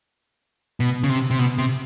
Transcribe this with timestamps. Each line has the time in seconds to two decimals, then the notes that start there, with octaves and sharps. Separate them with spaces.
0.80 B2
1.04 C#3
1.09 C3
1.31 C3
1.39 B2
1.58 C3